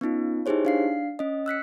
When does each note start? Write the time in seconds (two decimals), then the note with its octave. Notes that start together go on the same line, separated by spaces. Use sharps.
0.01 B3 C#4 D#4 F4
0.46 D#4 E4 G4 G#4 C5 C#5
0.65 D4 F5 C7
1.19 C#4 D#5
1.46 E6 F#6 B6 C#7